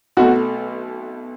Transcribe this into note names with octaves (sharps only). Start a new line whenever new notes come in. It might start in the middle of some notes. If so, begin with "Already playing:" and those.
B1 B2 A3 F#4